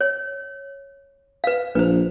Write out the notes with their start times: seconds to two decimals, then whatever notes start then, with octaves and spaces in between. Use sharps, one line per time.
0.01 C#5
1.44 B4 F5
1.75 A#1 B4 C5